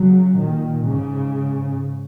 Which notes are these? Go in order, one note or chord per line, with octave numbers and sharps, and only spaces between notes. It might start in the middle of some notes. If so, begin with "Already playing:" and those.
Already playing: C#3 F#3
A#2 D#3
G#2 C#3